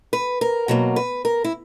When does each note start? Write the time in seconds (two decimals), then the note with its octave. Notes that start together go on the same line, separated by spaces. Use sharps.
0.13 B4
0.41 A#4
0.68 B2 F#3 A#3
0.96 B4
1.25 A#4
1.44 E4